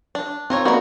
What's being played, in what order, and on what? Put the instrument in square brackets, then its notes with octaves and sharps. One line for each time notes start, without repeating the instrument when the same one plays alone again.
[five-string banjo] D4
[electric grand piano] C4 [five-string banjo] F4 A#4 C#5
[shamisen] A#3 B3 D#4 [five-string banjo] F#4 A#4 [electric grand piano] D5